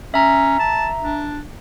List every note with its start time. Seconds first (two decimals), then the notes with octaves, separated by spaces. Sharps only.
0.14 C#4 E5 A#5
0.59 A5
1.01 D4